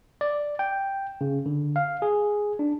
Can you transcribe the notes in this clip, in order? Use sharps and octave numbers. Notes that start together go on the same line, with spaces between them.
D5
G5
C#3
D3
F5
G#4
D4